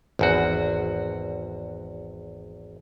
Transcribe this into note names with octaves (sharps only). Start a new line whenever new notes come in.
G#1 E2 F#4